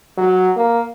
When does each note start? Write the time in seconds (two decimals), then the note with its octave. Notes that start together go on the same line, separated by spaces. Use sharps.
0.18 F#3
0.56 A#3